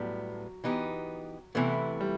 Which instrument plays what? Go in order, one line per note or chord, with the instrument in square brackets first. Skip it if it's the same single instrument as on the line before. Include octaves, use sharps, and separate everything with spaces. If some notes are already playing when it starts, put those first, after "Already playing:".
Already playing: [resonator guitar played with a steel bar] A2 G3 B3 [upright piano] F#3
[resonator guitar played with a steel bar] E3 B3 D#4 G4
[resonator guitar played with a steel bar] C3 E3 B3 E4 [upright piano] A3
[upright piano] G3